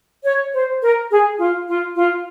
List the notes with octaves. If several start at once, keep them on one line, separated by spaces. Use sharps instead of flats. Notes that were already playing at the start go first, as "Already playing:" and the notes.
C#5
C5
A#4
G#4
F4
F4
F4